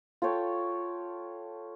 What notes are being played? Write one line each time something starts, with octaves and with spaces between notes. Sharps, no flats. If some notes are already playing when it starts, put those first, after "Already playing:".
F4 A4 C#5 G5